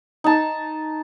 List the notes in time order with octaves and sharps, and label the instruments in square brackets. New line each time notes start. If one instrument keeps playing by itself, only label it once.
[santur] D#4 A5